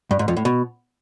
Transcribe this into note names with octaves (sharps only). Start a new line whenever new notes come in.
G2
G#2
F2
A2
B2